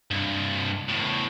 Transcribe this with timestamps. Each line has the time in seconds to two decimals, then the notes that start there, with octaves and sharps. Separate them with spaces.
0.11 C2 G2
0.89 E2 A2